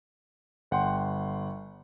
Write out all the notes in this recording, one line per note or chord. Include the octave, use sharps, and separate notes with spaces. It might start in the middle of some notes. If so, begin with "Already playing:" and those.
G1 F#5 G5 C6